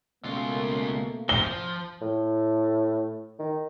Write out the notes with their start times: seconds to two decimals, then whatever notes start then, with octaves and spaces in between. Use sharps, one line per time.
0.25 C#2 B2 A3 A#3 F4
1.29 F3 G7
2.01 A2
3.39 D#3